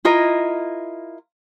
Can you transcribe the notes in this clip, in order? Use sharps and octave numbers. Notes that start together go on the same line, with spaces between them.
E4 F4 A#4 D#5